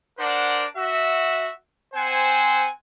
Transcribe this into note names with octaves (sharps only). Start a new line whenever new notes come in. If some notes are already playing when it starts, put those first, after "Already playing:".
D4 A#4 C5 D5 F#5
F#4 E5
C4 C5 F#5 G#5